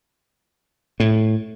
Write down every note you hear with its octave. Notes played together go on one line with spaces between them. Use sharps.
A2